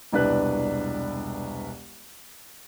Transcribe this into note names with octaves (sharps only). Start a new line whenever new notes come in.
E1 C2 D4 B4 F#6